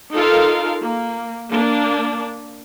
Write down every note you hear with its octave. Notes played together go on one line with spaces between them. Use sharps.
D#4 F4 A4 A#4 F5
A#3
A#3 D4